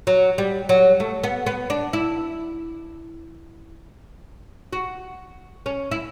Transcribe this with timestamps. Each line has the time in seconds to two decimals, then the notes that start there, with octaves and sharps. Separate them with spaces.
0.07 F#3
0.38 G3
0.69 F#3
1.00 A3
1.24 B3
1.46 B3
1.70 D4
1.93 E4
4.73 F#4
5.66 C#4
5.91 E4